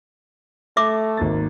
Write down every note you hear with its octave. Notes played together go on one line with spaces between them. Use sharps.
A3 E5 D6
G#1 A#3 A6